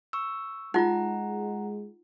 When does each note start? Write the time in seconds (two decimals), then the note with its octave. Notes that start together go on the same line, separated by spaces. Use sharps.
0.13 C#6 E6
0.74 G#3 D#4 F4 F#5 A#5